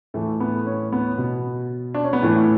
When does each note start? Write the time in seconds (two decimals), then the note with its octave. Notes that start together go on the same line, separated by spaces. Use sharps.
0.14 A2 E3 A3
0.40 B3
0.66 C#4
0.92 B3
1.18 B2
1.94 D4
2.04 C#4
2.13 B3
2.22 A2 E3 A3